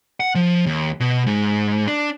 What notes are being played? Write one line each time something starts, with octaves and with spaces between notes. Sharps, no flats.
F#5
F3
D#2
B2
G#2
D4